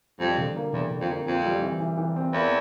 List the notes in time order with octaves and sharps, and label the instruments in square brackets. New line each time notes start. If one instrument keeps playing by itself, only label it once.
[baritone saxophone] F2 [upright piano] G3
[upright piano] D3
A#3
[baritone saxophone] E2 [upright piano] D3
[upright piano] D3
[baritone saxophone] F2
[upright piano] A#3
[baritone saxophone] F2 [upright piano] C4
[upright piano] G3
E3
E3
E3
C4
[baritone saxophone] E2 [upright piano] A#3